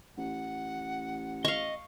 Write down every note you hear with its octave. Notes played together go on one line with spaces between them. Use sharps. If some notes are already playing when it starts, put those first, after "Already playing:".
A1 F#5
D#5 F5 C#6